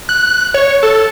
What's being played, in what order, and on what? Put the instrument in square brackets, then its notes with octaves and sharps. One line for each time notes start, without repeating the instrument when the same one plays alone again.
[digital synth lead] F#6
C#5
A4